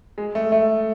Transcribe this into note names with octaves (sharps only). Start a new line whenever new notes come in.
G#3
A3
A3